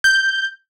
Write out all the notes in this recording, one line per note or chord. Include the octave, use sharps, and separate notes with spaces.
G6